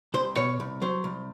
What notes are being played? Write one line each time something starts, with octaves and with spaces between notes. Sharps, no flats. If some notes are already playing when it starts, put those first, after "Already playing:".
C2 C5
B2 C#5
C2
F#3 C5
C2